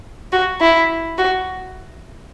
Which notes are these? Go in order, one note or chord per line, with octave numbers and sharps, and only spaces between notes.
F#4
E4
F#4